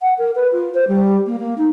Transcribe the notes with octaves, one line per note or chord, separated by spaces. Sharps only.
F#5
A#4
B4
F4
C5
G3
A#3
A#3
D#4